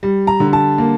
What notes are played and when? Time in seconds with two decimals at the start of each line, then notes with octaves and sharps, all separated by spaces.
0.03 G3
0.27 A#5
0.40 D3
0.53 A5
0.78 A#3